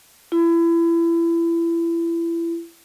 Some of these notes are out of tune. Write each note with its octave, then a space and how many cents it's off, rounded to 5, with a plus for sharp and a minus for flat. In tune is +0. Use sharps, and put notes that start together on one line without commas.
E4 +30